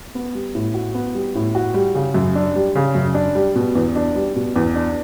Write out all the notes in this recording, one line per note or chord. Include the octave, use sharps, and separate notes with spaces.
B3
G3
A2
F#4
B3
G3
A2
F#4
G3
C#3
F#2
D4
G3
C#3
F#2
D4
G3
B2
E2
D4
G3
B2
E2
D4